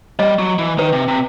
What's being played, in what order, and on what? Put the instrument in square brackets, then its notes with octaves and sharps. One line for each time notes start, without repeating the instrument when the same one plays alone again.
[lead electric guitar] G3 [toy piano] D#5
[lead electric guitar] F#3
E3
[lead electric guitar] D#3 [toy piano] B4
[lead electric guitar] C3
C3